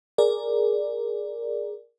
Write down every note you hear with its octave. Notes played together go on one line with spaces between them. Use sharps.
G#4 A#4 D5